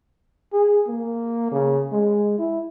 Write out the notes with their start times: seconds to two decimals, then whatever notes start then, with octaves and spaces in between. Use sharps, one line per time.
0.53 G#4
0.87 A#3
1.52 C#3
1.92 G#3
2.39 E4